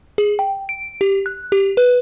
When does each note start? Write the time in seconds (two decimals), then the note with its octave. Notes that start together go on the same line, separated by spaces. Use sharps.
0.18 G#4
0.39 G5
0.69 D7
1.01 G4
1.26 F#6
1.52 G4
1.77 B4